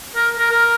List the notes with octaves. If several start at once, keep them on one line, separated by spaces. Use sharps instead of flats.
A#4
A#4
A#4